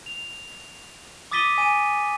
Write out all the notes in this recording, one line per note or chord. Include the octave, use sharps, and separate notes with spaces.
F7
D6 D#6 A6 B6 D#7 G7
G#5 D#7